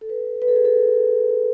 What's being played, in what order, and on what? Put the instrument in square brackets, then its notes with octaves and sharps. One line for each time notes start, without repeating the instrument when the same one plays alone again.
[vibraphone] A4
B4
B4
A4
G#4
A4